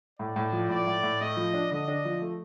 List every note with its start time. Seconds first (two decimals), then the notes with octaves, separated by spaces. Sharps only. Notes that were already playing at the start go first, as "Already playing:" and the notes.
0.19 A2 D5
0.36 A2
0.53 F3
0.69 A2 D5
0.87 A2
1.03 A2
1.21 A3 D#5
1.37 F3
1.54 D4
1.71 D3 D#5
1.88 D4
2.05 F3
2.22 A3